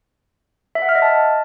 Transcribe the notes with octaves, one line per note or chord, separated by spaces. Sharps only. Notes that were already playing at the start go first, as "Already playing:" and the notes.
E5
F#5
F6
D#5
A5